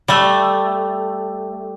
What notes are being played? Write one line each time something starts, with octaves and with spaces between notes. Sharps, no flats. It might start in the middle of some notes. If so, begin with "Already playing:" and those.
G3 A3